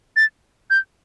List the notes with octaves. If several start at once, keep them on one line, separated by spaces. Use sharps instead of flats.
A6
G6